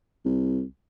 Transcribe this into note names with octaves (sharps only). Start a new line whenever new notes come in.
C2